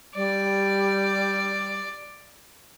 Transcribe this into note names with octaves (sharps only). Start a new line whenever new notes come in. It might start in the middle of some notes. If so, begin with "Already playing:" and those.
G3 D5